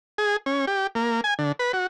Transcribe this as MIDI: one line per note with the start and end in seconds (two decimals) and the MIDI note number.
0.18 0.36 68
0.46 0.65 61
0.67 0.87 67
0.95 1.21 58
1.24 1.34 80
1.39 1.52 50
1.59 1.72 71
1.73 1.87 66